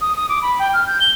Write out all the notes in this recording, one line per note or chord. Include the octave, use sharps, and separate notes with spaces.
D#6
D#6
D6
B5
G5
F6
G6
G7